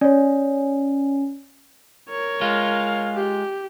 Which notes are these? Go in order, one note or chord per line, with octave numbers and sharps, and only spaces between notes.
C#4 C#5 D5
A#4 C#5
G#3 F4 F5
G4